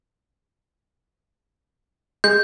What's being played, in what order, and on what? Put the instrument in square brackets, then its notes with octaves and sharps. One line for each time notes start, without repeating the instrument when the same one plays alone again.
[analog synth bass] G#3 [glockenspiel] G6